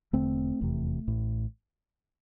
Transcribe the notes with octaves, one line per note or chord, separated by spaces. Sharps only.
E1 E2 D3 A3 C4
F1 E2 C3
A1 A2